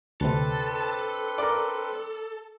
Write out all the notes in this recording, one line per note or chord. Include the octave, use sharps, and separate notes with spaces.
D2 C3 C4 D4 A4 B4
A#4 D5